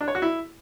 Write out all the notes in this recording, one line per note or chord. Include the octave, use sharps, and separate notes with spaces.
D4
C#5
F#4
E4